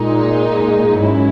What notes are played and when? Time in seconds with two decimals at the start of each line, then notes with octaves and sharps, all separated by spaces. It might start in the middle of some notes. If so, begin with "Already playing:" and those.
Already playing: A#2 G#3 D#4
1.00 G#2 F#3 C#4 E4